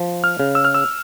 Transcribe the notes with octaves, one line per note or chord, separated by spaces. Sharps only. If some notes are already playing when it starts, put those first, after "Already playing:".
Already playing: F3
F6
C#3
E6
F6
E6